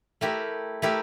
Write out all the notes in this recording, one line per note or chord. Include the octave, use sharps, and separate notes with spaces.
A3 E4 G4 A#4
A3 E4 G4 A#4